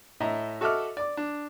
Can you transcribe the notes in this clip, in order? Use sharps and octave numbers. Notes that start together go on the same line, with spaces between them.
A2 D#5 E5 A#5
F#4 A4 D#5 E5 D6 F6
D5 D6
D4